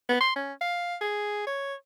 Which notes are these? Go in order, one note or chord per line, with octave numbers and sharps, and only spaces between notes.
B3
C6
C#4
F5
G#4
C#5